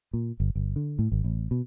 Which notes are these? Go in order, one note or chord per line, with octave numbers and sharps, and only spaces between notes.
A#2
G1
G1
D3
A2
G#1
A1
B2